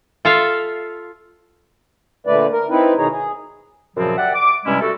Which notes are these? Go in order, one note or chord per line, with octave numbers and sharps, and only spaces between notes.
F4 A4 E5 F5
A#2 D3 A3 B4 D5
A#4
C4 D#4 E4 B4
B2 D#3 D#4 G#4 C#5 A#5
G#4
F#2 A#2 C#3 F3 F#3 C4
G4 D5 E5 F#5
D6
G2 C3 G3 G#3 C#4 E4
A3 F#4 G4 A4